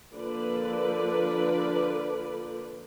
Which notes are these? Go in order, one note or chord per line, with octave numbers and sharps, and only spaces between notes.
D3 F3 A#3 B4 D5